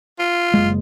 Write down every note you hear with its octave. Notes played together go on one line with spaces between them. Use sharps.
F4
F#1 G#3